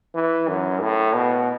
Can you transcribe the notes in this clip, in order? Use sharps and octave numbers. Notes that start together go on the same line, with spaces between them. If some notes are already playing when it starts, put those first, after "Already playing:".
E3
F#2
A2
B2